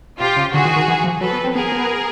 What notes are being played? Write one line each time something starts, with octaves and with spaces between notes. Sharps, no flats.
C3 F4 G4
C#3
D3 F#4 G#4
D#3
D#3
E3
F3
F#3 A4 B4
B3
C4
B3 G#4 A#4
B3